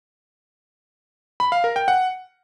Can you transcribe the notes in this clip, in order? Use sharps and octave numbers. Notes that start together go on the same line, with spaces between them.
B5
F5
A#4
G5
F#5